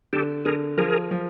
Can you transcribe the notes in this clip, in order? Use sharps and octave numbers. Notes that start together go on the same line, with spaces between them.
D3 G4 A4
D3 G#4 A#4
F3 G#4 A#4
F3